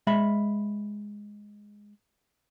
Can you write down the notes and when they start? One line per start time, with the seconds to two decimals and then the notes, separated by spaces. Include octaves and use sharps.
0.07 G#3 E5 B5